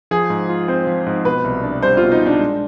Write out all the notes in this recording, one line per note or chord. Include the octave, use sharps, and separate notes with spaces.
F3 G#4
G#2
F4
C4 C5
F3
G#2
B2 B4
C2
D4
G3 C5
B2 F4
D#4
C2
D4
G#3